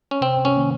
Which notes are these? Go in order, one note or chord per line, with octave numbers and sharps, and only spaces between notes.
C#4
C3 C4
C#4
D#3 A#3